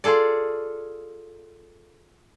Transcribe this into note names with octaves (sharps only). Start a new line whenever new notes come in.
F4 G#4 A4 D5